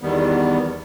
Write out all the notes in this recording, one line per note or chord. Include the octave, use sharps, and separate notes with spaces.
E2 D#3 G3 B3